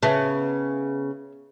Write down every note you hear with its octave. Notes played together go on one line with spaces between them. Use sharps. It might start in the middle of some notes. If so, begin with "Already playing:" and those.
C#3 B3 C#5 E5 A5